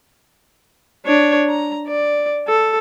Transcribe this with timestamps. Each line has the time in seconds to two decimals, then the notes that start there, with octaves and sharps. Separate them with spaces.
1.06 D4 C#5
1.49 A#5
1.87 D5
2.48 A4